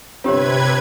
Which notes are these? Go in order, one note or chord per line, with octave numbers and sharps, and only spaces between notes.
G1 C3 C4 F4 G4 B4 C#5 G#6